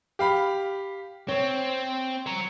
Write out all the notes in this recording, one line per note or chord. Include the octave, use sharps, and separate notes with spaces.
G4 F5 B5
C4 C#5
C#5 A#5